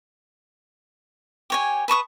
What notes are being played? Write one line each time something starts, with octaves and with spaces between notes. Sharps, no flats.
G4 C#5 G#5
B4 A5 C#6 D#6